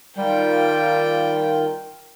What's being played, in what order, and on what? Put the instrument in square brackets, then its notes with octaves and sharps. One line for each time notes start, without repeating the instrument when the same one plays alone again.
[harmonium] D#3 F4 A#4 [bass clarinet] G3 [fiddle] G5